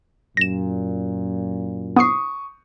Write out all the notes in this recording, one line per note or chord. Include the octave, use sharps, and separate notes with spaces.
F#2 A#2 A#6 E7
B3 C#6 D#6 C7